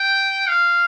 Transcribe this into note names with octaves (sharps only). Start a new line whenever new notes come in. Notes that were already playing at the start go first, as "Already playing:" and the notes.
Already playing: G5
F5